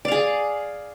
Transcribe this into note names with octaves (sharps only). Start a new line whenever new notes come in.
G#4 D5 F5